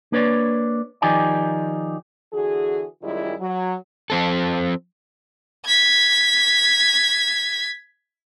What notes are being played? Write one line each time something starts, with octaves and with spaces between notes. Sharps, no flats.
A#3 D4 B4 C#5 D5
D#3 F3 D#4 G4 D5 G#5
D3 E3 F#4 G#4
F#2 D#3 G3 G#3 E4 F4
F#3
F3 C4 A4
G#6 B6